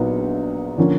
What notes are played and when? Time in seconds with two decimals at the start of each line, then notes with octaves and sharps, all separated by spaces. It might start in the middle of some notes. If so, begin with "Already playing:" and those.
Already playing: A#1 A#2 F#3 B3 D#4
0.78 D3 F3 A#3 C#4